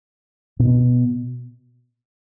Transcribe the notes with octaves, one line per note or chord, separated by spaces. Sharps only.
B2